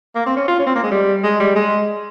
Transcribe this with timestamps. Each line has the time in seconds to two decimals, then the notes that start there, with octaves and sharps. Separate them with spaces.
0.15 A#3
0.26 C4
0.37 C#4
0.48 F4
0.59 C#4
0.67 C4
0.75 A#3
0.83 G#3
0.91 G3
1.24 G#3
1.40 G3
1.56 G#3